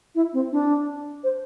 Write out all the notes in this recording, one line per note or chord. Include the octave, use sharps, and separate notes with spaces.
E4
C4
D4
C5